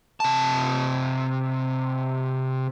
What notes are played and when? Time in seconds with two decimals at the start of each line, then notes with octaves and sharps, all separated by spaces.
0.20 C3 A5